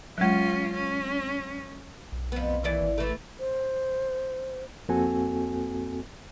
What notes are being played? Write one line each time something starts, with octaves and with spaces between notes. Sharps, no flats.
F#3 G#3 C#4 F4
C#4
B1
F2 B3
D#2 E3 D5
G#1
E3 A3
C5
F2 A#3 C4 F#4 A4 G#5